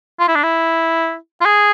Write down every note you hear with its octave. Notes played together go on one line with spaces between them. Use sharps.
F4
E4
D4
E4
F4
G#4